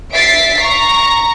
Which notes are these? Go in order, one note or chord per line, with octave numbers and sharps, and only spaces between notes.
E5 A6 B6 C7 D7
A#5 C#6